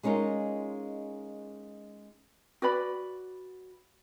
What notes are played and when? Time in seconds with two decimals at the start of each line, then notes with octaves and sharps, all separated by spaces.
0.03 G#3 C#4 D#4 F4 A#4
2.62 F#4 B4 D5 B5